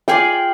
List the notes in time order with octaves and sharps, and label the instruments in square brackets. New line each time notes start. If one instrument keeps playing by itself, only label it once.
[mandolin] F4 G#4 D5 [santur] G5